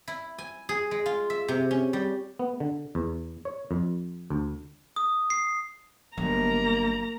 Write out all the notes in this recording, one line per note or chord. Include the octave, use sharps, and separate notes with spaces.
E4
G#5
G#4
G#3
F4
E5
C3
C#4
G3
B3
D3
E2
C#5
F2
D2
D#6
C7
G1 F#3 A#3 A#5